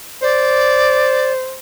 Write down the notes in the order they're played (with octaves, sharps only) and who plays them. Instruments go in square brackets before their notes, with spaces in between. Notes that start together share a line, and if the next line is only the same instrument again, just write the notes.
[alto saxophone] C5 [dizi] D5